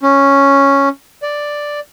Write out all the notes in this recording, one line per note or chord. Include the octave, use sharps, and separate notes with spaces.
C#4
D5